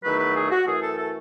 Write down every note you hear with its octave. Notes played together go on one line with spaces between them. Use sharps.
E2 D#3 F#3 A3 B4
B4
G#4
F#4
F#2 E3 A3 G#4
A4
A4